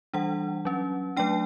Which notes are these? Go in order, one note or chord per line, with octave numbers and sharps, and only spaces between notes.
E3 G3 D4 F#5
F#3 C#4
F#3 A3 D4 G5